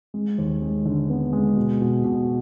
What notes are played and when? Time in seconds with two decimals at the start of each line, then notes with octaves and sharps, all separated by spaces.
0.14 G#3
0.38 D#2
0.62 G#3
0.85 D3
1.09 B3
1.33 G#3
1.57 B2
1.81 B2
2.04 B2